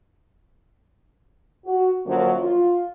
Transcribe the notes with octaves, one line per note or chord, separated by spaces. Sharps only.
F#4
F#2 D3 F3 F#3 A#3 C#5
F4